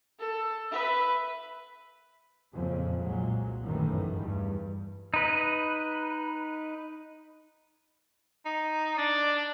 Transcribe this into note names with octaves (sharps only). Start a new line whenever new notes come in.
A4
B4 E5
F2 A#2 C#3
C2 A#2 F#3 G#3
G1 F#2 A2 D#3 E3
E2 G2
D#4 B4
D#4
D4 D5